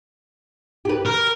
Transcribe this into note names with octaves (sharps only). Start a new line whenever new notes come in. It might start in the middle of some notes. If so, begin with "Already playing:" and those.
G4 B4
A#4